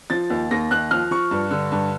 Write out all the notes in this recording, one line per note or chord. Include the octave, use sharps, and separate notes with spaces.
F3 A6
D#2
D#2 A#6
D#2 F#6
F3 F6
F3 C#6
G2
D3
G2